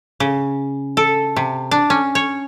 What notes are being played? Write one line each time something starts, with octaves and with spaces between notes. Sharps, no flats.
C#3
A4
C3
D4
C#4
C#5